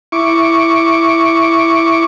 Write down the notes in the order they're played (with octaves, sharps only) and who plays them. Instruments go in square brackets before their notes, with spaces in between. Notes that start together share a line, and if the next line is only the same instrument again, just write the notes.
[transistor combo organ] E4 C#6 D6